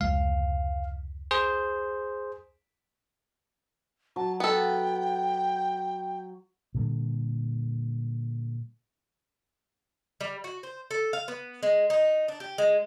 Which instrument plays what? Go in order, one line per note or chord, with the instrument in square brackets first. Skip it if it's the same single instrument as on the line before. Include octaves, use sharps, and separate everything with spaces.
[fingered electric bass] F1 C#2 G#3 [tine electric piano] F5
[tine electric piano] G#4 C5
[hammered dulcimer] F#3 [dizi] A5
[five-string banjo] B3 A4 [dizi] G5
[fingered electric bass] A#2 D3 G3
[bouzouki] G3
F#4
C5
A4
F5
B3
G#3
D#4
D4
G4
G#3